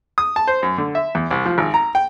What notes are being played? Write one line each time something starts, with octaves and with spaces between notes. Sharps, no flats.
D#6
A5
C5
F#2
D3
E5
E2
C2
F3
G#1
A#5
G5